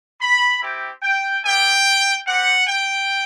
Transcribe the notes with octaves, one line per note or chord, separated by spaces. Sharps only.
B5
C4 E4 G4
G5
B3 E4 G4 G5
C4 G4 F#5
G5